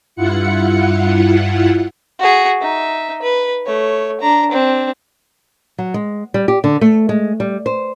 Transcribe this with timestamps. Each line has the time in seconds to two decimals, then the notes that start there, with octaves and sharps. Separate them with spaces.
0.16 G2 E4 F4 F#5 C#7
2.19 F#4 G#4
2.61 D#4 E5
3.22 B4
3.66 A3 C#5
4.21 D4 A#5
4.52 C4 D4
5.78 F#3
5.94 G#3
6.34 G3
6.48 G4
6.64 D3
6.81 A3
7.09 G#3
7.40 G3
7.66 C5